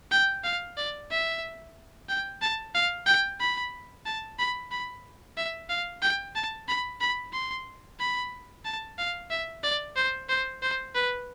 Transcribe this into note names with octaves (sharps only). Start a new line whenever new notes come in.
G5
F5
D5
E5
G5
A5
F5
G5
B5
A5
B5
B5
E5
F5
G5
A5
B5
B5
C6
B5
A5
F5
E5
D5
C5
C5
C5
B4